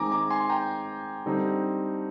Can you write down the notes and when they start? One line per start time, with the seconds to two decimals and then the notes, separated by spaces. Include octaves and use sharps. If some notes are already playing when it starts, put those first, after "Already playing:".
Already playing: D#3 G#3 C4 D#4 G#5 A#5 D6
0.12 A#5 D6
0.30 G#5 C6
0.50 G5 A#5
1.26 D3 G3 C4 D#4